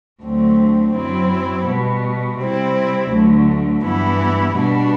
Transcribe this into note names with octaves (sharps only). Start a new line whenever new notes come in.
D2 D3 F#3 A3 C4
F#2 F#3 C4 E4
B2 G3 B3
C3 G3 C4 E4
D2 D3 F#3 A3
G2 E3 B3 E4
B2 G3 B3 D4